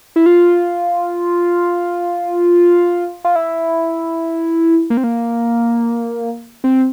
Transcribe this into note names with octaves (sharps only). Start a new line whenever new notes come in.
E4
F4
F4
E4
A#3
C4
A#3
C4